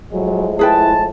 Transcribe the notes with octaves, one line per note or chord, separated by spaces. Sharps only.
A2 F3 F#3 G#3
E4 G#4 B4 G5 A5